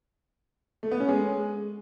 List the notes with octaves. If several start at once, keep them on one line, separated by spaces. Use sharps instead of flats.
A3
B3
C#4
G#3